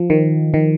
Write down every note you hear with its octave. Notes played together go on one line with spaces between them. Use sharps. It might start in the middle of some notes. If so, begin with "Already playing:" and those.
Already playing: F3
D#3
D#3